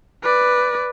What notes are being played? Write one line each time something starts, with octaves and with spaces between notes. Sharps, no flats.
B4 D5